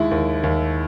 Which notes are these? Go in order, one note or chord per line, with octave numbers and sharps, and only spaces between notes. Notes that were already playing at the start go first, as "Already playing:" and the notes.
Already playing: D#2 G#3 E4
D#2
D#2